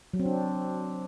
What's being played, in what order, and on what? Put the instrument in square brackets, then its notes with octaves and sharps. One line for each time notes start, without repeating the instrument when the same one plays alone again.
[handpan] F#3
C4
D4